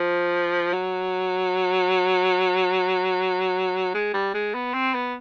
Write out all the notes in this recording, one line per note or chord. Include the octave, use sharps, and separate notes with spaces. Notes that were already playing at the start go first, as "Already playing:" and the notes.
Already playing: F3
F#3
G#3
G3
G#3
B3
C4
B3